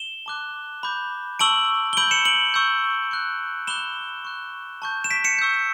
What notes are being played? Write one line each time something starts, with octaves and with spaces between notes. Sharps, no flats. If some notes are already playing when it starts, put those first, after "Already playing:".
Already playing: E7 G7
A5 D6 F#6
B5 D6 G6
A5 C#6 E6 D7 F#7
G7
B5 E6 G6 D7 F#7
C#7 E7
D7 F#7
C#6 E6 G6
C#6 F#6
B5 D6 F#6 E7 G7
C#6 F#6
A5 C#6 G6
E7
B6 D7
C#7 E7
C#6 E6 G6